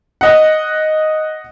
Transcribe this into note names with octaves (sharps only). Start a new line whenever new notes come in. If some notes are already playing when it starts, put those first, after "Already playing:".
D#5 F#5